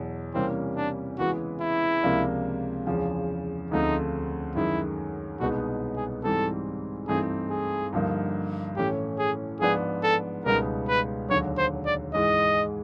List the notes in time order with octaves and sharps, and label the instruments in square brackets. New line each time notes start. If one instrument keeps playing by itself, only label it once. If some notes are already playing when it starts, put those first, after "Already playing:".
Already playing: [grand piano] E2 B2 F#3
[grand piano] C3 E3 G3 A#3 C#4 [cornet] C4
[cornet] D4
[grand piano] C#3 E3 G#3 B3 [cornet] F#4
[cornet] E4
[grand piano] C#2 C3 F3 A#3 D4
E2 C#3 F3
[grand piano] D2 C#3 F3 A3 C4 [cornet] D#4
[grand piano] F#2 D#3 G#3 [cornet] E4
[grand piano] C2 B2 G#3 B3 D#4 [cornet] F#4
[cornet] G#4
[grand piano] G#2 E3 G3 C4 [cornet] A4
[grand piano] G2 E3 A3 C4 D#4 [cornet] G#4
[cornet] G#4
[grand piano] G2 D3 F3 A#3 D#4
[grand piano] A2 E3 A3 C#4 [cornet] G4
[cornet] G#4
[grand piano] G#2 F3 G#3 B3 D4 [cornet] G#4
[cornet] A4
[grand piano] C#2 B2 G3 B3 D#4 [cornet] A#4
[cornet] B4
[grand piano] D#2 D3 F#3 [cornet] C#5
[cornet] C5
D5
[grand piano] G#2 E3 G#3 [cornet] D#5